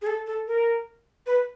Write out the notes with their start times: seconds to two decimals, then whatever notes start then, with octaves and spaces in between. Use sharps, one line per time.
0.02 G#4
0.07 A4
0.27 A4
0.47 A#4
1.26 B4